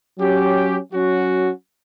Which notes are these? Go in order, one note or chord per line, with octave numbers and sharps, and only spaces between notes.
F#3 C#4 G4
F#3 C#4 F#4